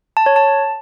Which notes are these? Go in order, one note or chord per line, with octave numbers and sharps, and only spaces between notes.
A5
C#5
A5